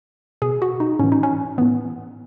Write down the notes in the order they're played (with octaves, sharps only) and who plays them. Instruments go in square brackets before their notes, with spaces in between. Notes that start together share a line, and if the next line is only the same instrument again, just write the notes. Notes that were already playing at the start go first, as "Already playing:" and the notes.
[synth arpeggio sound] B2 G#4
F#4
D#4
A2 E3 C#4
D#4
C#4
A2 E3 B3